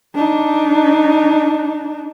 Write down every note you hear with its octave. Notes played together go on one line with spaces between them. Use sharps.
D4 D#4